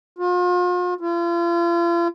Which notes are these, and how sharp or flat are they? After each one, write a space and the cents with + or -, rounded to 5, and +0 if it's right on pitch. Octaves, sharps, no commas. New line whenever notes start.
F4 +40
F4 -40